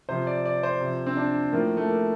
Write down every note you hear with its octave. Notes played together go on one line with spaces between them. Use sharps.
C3 F3 C5
D5
D5
C5
C3 F3
C4
D4
A2 F3 A#3
A3
A#3